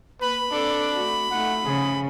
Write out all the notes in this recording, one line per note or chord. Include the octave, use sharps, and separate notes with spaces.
A#3 B4 B5
C4 D4 A4 D5
A3 F#4
A3 D#4 F4 F#5
C#3 F3 G#4